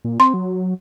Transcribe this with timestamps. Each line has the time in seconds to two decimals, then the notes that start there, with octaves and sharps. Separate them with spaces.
0.05 A#2
0.20 C4 C6
0.34 F#3